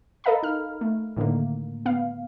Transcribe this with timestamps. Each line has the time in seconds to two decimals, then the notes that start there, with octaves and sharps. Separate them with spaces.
0.24 A4 A#4 D#5 F5 A#5 B5
0.43 D#4 F6
0.81 A3
1.17 A2 D3 D#3 A3 A#3
1.86 B3 F5